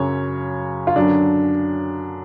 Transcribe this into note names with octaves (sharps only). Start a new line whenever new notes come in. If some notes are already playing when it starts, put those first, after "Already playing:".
Already playing: F#2 C#3 F#3 C#5
F4
F#2 D3 F#3 D4